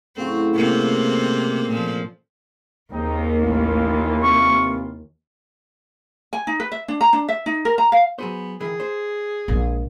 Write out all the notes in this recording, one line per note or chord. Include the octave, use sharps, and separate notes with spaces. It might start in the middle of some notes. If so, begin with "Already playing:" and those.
A2 C#3 F#3 C4
C3 A#3 C4
A#2 F3
D#2 C#3 C4 D#4
A1 E3 F4
C3 C#6
G#5
D#4
B4
E5
D4
A#5
D4
E5
D#4
A#4
A#5
F5
F#3 B3 G#4 C5
D#3 E3 G#4
C5
A#1 G#3